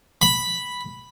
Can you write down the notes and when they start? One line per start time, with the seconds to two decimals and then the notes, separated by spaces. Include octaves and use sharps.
0.22 B5